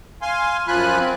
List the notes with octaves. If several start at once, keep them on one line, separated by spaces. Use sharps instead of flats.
F5 G#5 C6
F#2 F3 F4 G#5 B5 F#6
C4